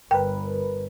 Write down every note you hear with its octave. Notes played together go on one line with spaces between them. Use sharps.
G1 A#4 B4 G5